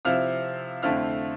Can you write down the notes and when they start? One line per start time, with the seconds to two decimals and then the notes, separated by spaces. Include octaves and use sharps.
0.05 C3 F3 C4 E4 F5 F6
0.83 F2 D3 A3 C4 E4 F5 F6